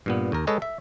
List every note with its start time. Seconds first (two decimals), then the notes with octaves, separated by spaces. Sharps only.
0.06 G2 A#2 B3
0.32 D#2 A#4
0.47 G#3 A4 B4 C#5 D#5
0.62 E5